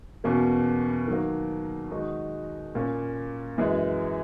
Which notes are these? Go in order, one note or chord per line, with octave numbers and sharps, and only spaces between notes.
E2 B2 A#3 C#4
D#3 F#3 A#3
D#3 G#3 D#4 F#4
A#2 A#3 C#4
F#2 E3 G#3